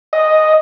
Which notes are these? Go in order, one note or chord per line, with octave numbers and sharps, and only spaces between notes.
D#5